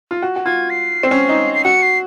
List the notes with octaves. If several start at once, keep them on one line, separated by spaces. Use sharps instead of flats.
F4
F#4
F#4
F4 G#6
C7
C4
C#4
D#4
C7
F#4 C#7
C7